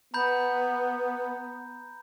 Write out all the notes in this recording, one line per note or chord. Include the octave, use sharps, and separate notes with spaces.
B3 A#5 B5 G6